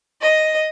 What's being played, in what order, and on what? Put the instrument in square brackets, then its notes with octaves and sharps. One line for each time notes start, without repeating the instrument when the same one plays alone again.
[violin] D#5